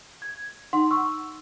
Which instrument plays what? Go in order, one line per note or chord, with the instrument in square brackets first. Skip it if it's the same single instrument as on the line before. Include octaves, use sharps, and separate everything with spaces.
[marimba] G#6
[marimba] D#4 [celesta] F#5 C6
[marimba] C#6 [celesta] E6